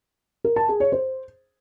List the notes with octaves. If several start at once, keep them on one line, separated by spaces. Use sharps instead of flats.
A#4
A5
G#4
C#5
C5